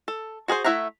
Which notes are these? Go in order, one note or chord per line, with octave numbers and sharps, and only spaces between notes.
A4
F#4 G#4 B4 C5
A3 E4 E5 F#5 A#5